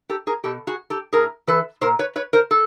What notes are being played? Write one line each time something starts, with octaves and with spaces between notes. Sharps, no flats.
G4 A4
G#4 A#4
B2 G4 A4
F#4 G#4
G4 A4
A2 G#4 A#4
E3 A4 B4
A#2 A#4 C5
B4 C#5
B4 C#5
A#4 C5
A4